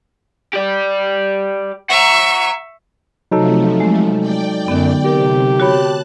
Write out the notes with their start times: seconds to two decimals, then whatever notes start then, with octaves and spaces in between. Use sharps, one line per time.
0.53 G4 D5
1.90 E5 F#5 A#5 C#6
3.32 C3 F3 F#3 A3 D#4 A4
3.80 G#3
4.20 D5 G5
4.68 F#2 D3 B3
5.04 C3 G4 A#4
5.60 F#4 C#5 A5 B5 F#6